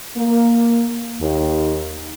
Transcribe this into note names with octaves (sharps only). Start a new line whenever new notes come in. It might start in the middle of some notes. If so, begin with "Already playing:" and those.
A#3
D#2